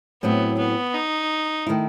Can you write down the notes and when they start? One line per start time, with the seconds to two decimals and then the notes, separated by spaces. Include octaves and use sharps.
0.23 A2 F#3 B3 C4 E4
0.58 B3
0.94 D#4
1.66 D#3 A3 E4